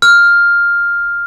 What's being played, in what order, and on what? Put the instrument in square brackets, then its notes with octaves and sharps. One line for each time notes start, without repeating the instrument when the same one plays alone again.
[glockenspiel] F6